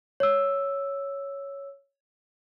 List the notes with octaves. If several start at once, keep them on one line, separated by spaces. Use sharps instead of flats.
C#5 E6